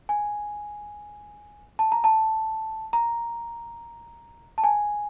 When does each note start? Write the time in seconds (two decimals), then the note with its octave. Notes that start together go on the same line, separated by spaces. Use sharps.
0.09 G#5
1.79 A5
1.92 A#5
2.04 A5
2.93 A#5
4.58 A5
4.64 G#5